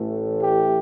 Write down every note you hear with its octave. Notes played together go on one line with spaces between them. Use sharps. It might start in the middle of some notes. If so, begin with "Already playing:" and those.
Already playing: A1 A2 E3 A3
G4